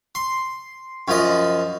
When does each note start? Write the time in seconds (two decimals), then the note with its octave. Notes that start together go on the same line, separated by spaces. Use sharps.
0.15 C6
1.08 F#2 F3 D#5